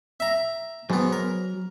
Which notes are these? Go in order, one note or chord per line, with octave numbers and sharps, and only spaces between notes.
E5 A#5
G#2 F#3 B3
A#4